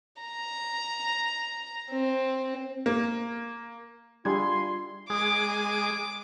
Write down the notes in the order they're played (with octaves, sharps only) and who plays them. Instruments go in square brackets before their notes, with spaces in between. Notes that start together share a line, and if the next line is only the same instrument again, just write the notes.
[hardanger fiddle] A#5
C4
[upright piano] A#3
[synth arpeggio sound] G3 G#6 [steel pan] D4 E4 G#4 [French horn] F4 [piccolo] C6
[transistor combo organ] G#3 G#4 D#6 [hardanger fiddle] D6